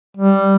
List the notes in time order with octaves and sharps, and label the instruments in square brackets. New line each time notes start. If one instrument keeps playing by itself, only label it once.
[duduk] G3